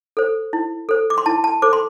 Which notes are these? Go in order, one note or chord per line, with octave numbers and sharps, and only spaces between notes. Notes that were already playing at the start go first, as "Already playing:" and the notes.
A4 C5
E4
A4 C5
D6
C6
E4 A5
A5
A4 C5 D6
C6